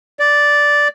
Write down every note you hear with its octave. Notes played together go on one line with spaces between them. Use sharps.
D5